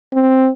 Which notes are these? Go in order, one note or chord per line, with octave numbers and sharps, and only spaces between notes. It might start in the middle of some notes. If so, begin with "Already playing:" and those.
C4